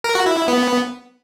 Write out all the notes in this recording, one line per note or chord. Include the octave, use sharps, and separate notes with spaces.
A#4
F#4
E4
E4
B3